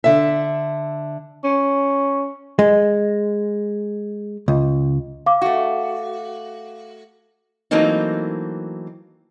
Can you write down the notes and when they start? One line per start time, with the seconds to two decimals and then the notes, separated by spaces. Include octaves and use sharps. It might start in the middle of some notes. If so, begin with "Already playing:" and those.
0.04 D3 E5
1.44 C#4
2.59 G#3
4.48 C#2
5.26 F5 D6
5.42 A3 F#4
7.71 E3 F#3 A3 A#3 C4 D#4